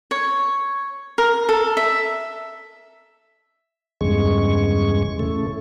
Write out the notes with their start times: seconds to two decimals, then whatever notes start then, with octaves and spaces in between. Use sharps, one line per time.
0.11 C#5
1.18 A#4
1.49 A4
1.77 E5
4.01 E2 G2 C#3 G#3 C#6
5.19 A2 C#3 A3